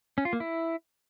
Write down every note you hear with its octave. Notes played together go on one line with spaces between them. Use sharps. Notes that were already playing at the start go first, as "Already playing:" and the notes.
C#4
F4
A#3
E4